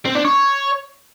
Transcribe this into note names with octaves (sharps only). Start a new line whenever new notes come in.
C4
D4
C#5